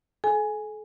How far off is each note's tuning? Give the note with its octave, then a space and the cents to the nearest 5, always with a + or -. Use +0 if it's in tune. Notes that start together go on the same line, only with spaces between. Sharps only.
A4 -40 G#5 +0